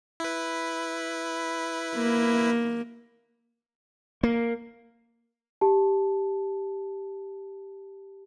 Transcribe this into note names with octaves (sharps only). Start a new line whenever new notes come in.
E4 B4
A#3
A#3
G4 A5